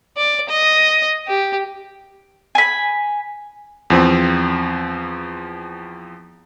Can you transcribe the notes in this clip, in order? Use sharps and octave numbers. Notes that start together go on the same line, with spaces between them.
D5
D#5
G4
G#5 B5
E2 F3 C4